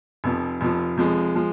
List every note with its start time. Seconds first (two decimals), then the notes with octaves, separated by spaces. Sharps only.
0.24 F1 F2 F3
0.61 F1 F2 F3
0.97 F1 F2 F3 G#3
1.35 F3 G#3